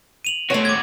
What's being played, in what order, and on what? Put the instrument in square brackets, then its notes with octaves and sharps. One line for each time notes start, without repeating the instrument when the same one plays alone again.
[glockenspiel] D#7 F7 F#7
[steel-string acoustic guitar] A3 C#5 [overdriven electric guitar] C4 F#4
[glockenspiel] D6 G#6